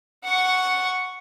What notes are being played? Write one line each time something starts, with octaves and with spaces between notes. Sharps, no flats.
F#5 C#6